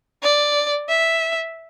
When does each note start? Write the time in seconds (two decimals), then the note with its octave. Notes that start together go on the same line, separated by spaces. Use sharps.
0.23 D5
0.89 E5